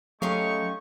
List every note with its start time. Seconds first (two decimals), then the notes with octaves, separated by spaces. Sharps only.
0.22 F#3 G#3 A3 C#4 D#4 G4 F5 C#6